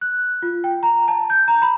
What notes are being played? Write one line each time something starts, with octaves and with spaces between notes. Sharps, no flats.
F#6
F4
G5
A#5
A5
G6
A#5
B5